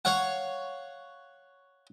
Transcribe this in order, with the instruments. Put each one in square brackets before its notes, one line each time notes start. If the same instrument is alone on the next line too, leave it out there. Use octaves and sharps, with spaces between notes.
[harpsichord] C#5 F5 F#5